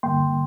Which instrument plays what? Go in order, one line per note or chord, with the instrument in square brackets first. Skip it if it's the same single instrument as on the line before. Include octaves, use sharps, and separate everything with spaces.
[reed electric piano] G2 D3 G3 A#3 G5 C6